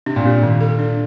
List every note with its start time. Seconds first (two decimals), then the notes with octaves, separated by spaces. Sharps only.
0.06 C3 D4
0.16 A#2
0.25 C3 A#3
0.43 A#2 D#3
0.61 A4
0.79 D4